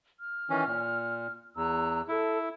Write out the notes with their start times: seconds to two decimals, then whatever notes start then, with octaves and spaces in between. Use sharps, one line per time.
0.19 F6
0.50 D#3 E3 C#4
0.66 A#2
1.56 E2 A#5 E6 F#6
2.08 E4 A4